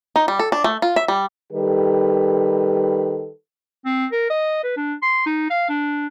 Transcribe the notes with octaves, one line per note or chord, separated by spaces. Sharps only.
D#4
G3
A4
D4
A3
F4
E5
G3
D#3 G3 G4 A4 B4
C4
A#4
D#5
B4
D4
C6
D#4
F5
D4